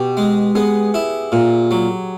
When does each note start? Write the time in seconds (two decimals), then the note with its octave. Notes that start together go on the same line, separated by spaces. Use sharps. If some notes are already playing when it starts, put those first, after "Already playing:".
Already playing: B2 G4
0.17 G#3
0.55 B3 G#4
0.94 E4
1.32 A#2
1.71 F#3